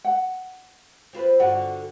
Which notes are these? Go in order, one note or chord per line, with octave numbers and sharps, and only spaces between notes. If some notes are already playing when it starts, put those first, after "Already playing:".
F#5
C4 F4 B4
G2 D3 F#4 D5 F#5